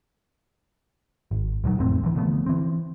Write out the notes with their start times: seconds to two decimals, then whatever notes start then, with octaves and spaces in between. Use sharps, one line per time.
1.31 G#1
1.64 D#1 C#2 D#3 F#3
1.78 G1 F2 A2 C4
2.04 D2 E3
2.16 D3 F3 A3 B3
2.46 E3 C4